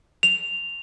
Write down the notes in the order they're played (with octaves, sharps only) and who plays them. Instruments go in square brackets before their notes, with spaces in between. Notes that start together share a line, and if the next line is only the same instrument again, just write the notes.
[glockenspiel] F7